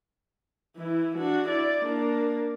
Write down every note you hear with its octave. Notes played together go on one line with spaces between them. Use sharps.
E3 E4
D4 F#4
E4 D5
A#3 D4